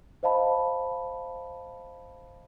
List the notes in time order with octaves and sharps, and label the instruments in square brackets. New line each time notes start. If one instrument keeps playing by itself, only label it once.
[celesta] C5 D#5 F5 A5 B5